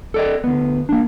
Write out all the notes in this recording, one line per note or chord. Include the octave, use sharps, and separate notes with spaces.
A4 D5 D#5
D2 B3
A#3 D4